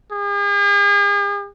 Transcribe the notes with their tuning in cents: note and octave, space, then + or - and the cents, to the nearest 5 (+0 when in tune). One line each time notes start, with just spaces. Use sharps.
G#4 -45